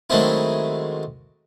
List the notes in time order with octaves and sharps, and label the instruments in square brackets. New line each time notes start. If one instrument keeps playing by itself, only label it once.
[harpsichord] D#3 F#3 G#3 A3 C4 E4